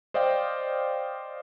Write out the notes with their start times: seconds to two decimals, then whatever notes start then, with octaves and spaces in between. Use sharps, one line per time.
0.14 C5 D5 D#5 F5 G5